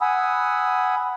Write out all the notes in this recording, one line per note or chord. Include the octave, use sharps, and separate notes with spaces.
F#5 G#5 B5 D#6 E6